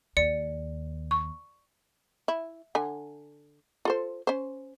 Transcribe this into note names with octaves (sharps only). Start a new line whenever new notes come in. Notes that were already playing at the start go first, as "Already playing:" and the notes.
D#2 D5 C#7
C#6
E4
D3 G#5
F4 A4 C5
C#4 C5